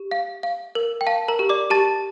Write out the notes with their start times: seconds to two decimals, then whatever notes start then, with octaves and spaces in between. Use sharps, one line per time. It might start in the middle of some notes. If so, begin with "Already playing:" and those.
Already playing: G4
0.11 F5
0.43 F5
0.75 A#4
1.01 G5
1.07 F5 A5
1.28 A#4 A#5
1.39 G4
1.49 D5 D6
1.70 G4 A5 A6